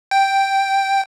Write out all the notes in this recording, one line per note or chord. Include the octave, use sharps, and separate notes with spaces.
G5